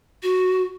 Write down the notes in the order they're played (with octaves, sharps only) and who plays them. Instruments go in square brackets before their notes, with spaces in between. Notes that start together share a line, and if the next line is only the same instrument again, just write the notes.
[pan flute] F#4